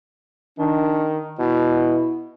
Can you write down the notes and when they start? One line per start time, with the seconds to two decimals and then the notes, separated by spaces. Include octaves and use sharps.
0.59 D#3 D4
1.39 B2 E4